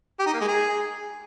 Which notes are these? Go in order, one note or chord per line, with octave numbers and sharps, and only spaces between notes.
G4
D#4
A#3
G#3
G#4